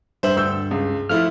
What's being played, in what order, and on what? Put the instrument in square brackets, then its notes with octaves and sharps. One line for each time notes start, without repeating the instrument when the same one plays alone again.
[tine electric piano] G2 [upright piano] C5 E5 F#7
[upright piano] D2 E6 G6
C#2
[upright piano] F3 A3 E4 [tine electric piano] F6